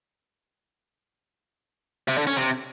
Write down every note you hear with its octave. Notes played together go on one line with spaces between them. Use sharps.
C3
D3
C#4
C3